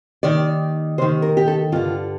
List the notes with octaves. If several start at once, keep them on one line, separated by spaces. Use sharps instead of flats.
D#2 D#3 D5
D#2 D#3 C5
A#4
G4
A4
G2 D3 F4